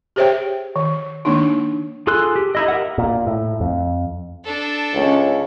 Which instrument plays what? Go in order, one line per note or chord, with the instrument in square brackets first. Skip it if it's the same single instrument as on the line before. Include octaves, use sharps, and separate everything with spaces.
[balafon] G4 G#4 C5 C#5 E5 G5
D#3
D#3 G#3 A#3 D4 D#4
[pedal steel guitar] F4 G#4 A4 C6 F#6
G4
D#4 E4 D#5
G4 A#4 E5 F#5
[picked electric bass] A#2
A2
F2
[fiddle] D4 A4
[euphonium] C#2 [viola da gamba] C#4